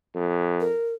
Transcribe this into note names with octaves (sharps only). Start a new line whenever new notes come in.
F2
A#4